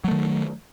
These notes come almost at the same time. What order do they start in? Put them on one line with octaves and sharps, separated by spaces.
F#3 A3 D#3